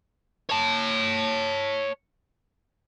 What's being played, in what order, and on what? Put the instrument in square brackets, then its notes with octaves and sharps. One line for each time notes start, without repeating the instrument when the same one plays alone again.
[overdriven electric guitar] C#5 A5